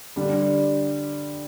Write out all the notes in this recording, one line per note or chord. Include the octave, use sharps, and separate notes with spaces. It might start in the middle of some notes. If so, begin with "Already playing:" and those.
D3 G3 D4